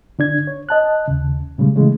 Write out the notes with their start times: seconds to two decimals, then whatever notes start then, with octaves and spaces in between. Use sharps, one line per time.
0.19 D3 D4 G#6
0.47 C#5
0.69 D#5 A5 F#6
1.08 D#2 C#3
1.58 A#2 C#3 G3 G#3
1.76 C#3 E3 G#3 A3